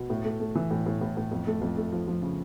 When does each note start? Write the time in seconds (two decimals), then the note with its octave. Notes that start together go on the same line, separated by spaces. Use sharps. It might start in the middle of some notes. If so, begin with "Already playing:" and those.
Already playing: B2
0.10 A2
0.24 A3
0.40 A3
0.55 E3
0.71 A2
0.86 A2
1.01 A2
1.17 A2
1.31 F2
1.47 A3
1.61 F2
1.77 A3
1.93 F3
2.08 F3
2.23 C#3